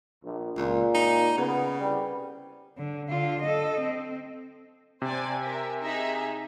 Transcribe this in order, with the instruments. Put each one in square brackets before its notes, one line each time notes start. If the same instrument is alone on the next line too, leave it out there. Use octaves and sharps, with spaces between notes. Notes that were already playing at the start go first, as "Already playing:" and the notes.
[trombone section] A#1
[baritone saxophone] C#2 [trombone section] A#2
[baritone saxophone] D#4
[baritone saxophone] C#3 [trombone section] B3
[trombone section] C2 G3
[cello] D3
D3 F4
A4 D#5
C4
[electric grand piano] C3 [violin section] C5 D5 G#5
[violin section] A#4 E5
D#4 G#4 E5